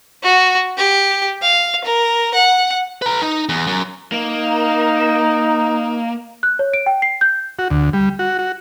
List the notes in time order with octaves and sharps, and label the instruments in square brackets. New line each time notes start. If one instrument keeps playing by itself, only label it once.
[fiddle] F#4
G4
F5
A#4
F#5
[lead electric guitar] B4 A#5
D#4
E2
F#2
[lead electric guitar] A#3 [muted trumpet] D#4
[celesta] F#6
C#5
D7
G5
C7
G6
[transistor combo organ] F#4
D2
G3
F#4
F#4